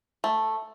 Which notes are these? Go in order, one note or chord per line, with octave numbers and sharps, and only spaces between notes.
A3